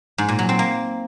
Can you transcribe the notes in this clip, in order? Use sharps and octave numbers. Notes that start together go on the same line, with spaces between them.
G#2
A#2
F#3
C4
A#3